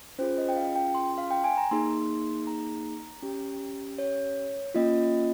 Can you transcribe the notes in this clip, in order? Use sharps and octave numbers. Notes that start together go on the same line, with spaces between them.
C#4 F4 G#4 C5
D#5
G5
F5
G5
C6
F5
G5
G#5
A#5
A#3 D#4 G#4 C6
A#5
C#4 G4
C#5
A#3 C#4 F4 D#5